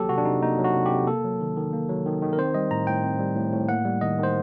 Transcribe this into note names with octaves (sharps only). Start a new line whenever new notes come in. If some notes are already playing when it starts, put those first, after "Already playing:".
Already playing: F#3 A#3 G4 A4
C3 F#4
D4
C3 D#4
A#3 D#4
F#3
F#4
C3
G4
C3
A#3 A4
F#3
D#3
D#3
A#3
F#3
D#3
D#3
A#4
C4 C5
G3 D#5
A2 A#5
A2 G5
C4
G3
A2
A2
A#3 F#5
G3
D#3 D#5
D#3 C5